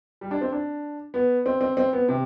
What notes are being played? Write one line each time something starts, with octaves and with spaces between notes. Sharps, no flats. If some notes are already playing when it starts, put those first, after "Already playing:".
G3
D4
C4
D4
B3
C4
C4
C4
B3
C3